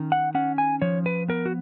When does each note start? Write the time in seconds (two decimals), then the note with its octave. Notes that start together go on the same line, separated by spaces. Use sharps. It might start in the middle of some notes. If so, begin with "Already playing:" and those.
Already playing: D#3 C#4
0.12 F#5
0.35 C#4 F#5
0.58 G#5
0.82 F3 C#5
1.06 B4
1.28 B3 A#4
1.46 F#4